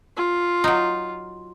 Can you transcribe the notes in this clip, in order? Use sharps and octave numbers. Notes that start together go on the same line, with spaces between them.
F4
F#3 D#4